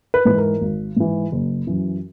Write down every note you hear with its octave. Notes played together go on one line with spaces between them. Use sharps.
B4
G#2 E3 B4
A#4
G#1
G#2 E3
F#1
F#2 E3